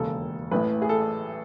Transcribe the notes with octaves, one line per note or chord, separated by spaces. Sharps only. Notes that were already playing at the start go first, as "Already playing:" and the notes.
Already playing: E1 D#2 C#3 A4
A1 A2 E3 B4
G#4
A4